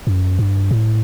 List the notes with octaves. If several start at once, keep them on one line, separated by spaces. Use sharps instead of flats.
F#2
G2
A2